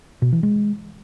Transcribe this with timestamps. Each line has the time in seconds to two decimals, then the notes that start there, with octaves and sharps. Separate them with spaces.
0.22 B2
0.32 E3
0.43 G#3